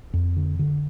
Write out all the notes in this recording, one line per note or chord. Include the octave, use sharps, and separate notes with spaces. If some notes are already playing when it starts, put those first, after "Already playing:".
F2
D3
D3